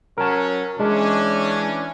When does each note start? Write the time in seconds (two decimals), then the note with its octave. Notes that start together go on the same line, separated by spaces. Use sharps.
0.18 F#3 C#4 A#4 A5
0.80 E3 G#3 C#4 D4